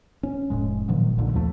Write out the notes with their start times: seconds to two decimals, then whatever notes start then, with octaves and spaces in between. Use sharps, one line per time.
0.23 C#4
0.50 F1 A2 G#3
0.88 A#2 D#3 F3 F#3
1.17 B1 A#2 D3
1.33 D#2 F3 F#3 A3